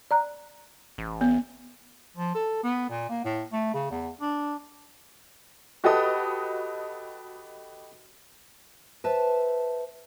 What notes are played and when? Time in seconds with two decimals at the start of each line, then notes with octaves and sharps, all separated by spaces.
0.11 D5 A#5 F#6
0.98 A1
1.21 B3
2.17 F3
2.34 A4
2.63 B3
2.89 A#2
3.09 A#3
3.24 A2
3.52 A3
3.74 C#3
3.90 E2
4.21 D4
5.84 F#4 G4 A4 B4 D#5 D#6
9.04 B4 C5 E5 A5